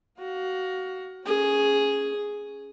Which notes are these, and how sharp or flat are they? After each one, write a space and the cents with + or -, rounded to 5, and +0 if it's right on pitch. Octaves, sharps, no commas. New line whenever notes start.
F#4 +20 F5 +25
C#4 +0 G#4 +0